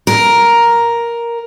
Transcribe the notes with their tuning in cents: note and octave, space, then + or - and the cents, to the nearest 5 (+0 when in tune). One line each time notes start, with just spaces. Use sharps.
A#4 +5